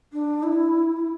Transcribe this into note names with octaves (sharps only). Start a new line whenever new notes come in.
D4
E4